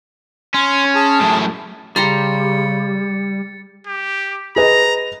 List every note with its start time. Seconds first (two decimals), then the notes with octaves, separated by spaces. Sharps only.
0.54 C#4 C6
0.95 G#4 A5
1.20 F#2 A2
1.96 C#3 G3 G4 A#5 C6 A6 C#7
3.87 G4
4.56 G#4 B4 D#5 A#5